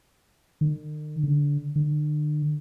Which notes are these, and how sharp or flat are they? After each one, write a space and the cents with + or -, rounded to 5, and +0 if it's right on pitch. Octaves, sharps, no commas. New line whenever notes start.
D#3 -45
D3 -20
D3 +40